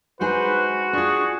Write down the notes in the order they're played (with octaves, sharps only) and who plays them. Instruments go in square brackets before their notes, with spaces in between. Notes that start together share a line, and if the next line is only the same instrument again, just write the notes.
[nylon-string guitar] G#3 D#4 G#4 [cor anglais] F#4 [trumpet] B4 [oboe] C5
[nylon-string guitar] D4 F4 [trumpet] G#4 [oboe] C#6